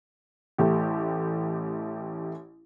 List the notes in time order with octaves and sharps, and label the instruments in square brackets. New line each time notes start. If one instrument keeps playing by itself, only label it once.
[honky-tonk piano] A1 A3 G4